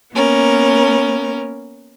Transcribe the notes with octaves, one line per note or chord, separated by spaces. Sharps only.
A#3 B3 C#4 A#4